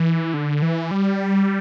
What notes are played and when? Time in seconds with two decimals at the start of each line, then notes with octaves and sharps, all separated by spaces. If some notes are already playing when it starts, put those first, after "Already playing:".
Already playing: E3
0.34 D3
0.62 E3
0.91 G3